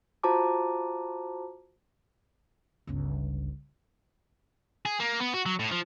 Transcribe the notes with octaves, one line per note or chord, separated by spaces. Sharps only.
F4 F#4 C5 A5 A#5 D6
G1 C#2
G#4
A#3
B3
F#4
F#3
A2
F3